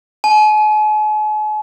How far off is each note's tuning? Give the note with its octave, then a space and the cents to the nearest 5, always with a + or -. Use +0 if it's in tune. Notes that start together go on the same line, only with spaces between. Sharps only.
G#5 +45